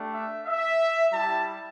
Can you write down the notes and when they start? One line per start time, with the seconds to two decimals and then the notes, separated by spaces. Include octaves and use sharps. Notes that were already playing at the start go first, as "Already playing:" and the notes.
Already playing: A3 D4 G4
0.13 E5
0.46 E5
1.14 G3 E4 G4 A5